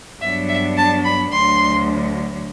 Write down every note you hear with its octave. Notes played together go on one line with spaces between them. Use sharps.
G2 F#3 B3 D4 E5
E5
A5
B5
D2 D3 F#3 C6